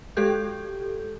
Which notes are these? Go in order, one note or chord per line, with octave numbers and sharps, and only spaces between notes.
G#3 G4 A4 G6